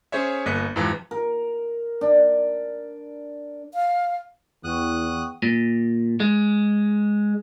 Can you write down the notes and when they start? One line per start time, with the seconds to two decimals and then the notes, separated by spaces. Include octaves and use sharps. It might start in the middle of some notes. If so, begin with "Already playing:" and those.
0.12 C#4 G#4 C5 C#5 E5
0.46 G1 A#3 D#5 F#6 B6 C#7
0.76 F2 G#2 C3 E3 F3
1.11 A#4
2.01 D4
3.74 F5
4.64 E2 E3 F#5 G5 C#6 D#6 F#6
5.43 A#2
6.20 G#3